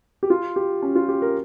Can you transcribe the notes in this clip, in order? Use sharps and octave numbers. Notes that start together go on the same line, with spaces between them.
G4
F4
G4
C#4
F4
G4
A#4